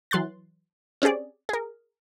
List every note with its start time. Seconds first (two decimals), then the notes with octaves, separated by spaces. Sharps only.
0.11 E3 F#3 C6 F#6 A6
1.02 C4 C#4 G4 G#4 D5
1.49 G#4 A#4